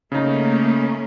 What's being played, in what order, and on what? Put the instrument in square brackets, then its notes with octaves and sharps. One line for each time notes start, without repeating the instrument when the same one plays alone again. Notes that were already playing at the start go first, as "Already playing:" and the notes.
[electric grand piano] C#3 D#4 [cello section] A3 A#3 C#4